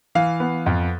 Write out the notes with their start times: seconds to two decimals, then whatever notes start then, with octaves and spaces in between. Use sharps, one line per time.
0.15 E3 F5
0.40 B3
0.66 F2